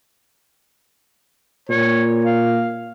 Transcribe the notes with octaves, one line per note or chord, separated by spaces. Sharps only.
A#2 C#5
F5